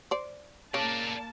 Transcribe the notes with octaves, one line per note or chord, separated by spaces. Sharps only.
C5 D5
C#3 A#3 A#4 D5 A5